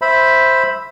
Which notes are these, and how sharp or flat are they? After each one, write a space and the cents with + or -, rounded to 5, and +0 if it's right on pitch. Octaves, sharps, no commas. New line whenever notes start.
C5 +0 E5 +0 B5 +0